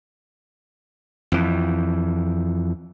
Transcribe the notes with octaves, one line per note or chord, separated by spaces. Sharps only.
F2 E3